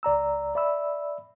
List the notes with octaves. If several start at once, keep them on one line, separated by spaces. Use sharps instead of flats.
C#2 D5 A#5 E6
D5 E5 B5 E6